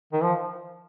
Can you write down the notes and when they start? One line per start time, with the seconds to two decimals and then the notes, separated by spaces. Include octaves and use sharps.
0.13 D#3
0.22 F3